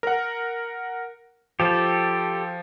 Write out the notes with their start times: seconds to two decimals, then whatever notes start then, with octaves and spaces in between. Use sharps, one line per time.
0.03 A#4 F#5
1.60 F3 G4 A4